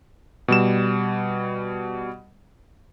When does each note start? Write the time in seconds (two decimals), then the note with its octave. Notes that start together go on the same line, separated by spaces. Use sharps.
0.48 B2 G3 E7